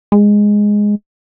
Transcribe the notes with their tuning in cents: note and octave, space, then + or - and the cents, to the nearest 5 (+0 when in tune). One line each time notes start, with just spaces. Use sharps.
G#3 -5